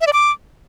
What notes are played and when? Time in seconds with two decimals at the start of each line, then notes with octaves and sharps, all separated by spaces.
0.01 E5
0.07 D5
0.13 D6